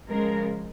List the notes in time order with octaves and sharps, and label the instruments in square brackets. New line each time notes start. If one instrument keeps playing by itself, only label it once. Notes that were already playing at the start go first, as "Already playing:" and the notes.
[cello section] C#3 F3 G#3 A#4